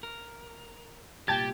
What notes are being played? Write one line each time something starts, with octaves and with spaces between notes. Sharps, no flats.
A#4
C2 A#2 G4 G5 A5 G#6 A6